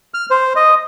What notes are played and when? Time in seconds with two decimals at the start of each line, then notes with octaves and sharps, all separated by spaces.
0.14 F6
0.31 C5
0.56 D#5